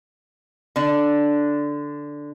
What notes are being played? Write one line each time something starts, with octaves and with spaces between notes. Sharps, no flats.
D3 D4